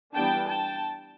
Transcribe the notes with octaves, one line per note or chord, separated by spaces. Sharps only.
E3 G3 B3 D4 G5 A5
G5 A5